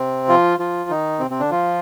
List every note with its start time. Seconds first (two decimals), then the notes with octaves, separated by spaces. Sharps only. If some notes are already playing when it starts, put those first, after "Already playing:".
Already playing: C3 C4
0.29 F3 F4
0.59 F3 F4
0.90 D#3 D#4
1.19 C3 C4
1.30 C3 C4
1.40 D3 D4
1.51 F3 F4